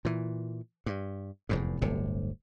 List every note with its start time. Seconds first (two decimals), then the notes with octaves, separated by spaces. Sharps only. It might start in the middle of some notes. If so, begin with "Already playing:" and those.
0.05 A#2 E3
0.86 G2
1.49 F1 E2 G#2
1.82 D1 G1 C3